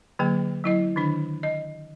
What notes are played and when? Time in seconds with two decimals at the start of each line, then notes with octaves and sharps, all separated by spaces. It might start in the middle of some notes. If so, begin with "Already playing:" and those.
0.19 D3 F#3 A#3 G#4 G5
0.64 F#3 E4 D#5
0.96 D3 D#3 D4 B5
1.43 D#5